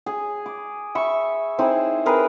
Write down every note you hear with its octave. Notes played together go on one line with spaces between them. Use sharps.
G#4
D6
E5 B5 C#6
C4 D#4 E4 G#4
C4 G#4 A#4 B4